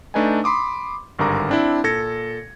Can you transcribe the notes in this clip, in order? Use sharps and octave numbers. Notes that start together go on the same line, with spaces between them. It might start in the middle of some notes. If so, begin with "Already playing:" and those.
A3 D4 D#4 B4 D#5 G#5
B5 C6 D6 D#6
G#1 G2 D3 A#4 A#5 D6
C4 D4 E4
A#2 A4 G#6 A#6 C#7